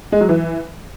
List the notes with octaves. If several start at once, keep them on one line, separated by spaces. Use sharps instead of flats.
G#3
F#3
E3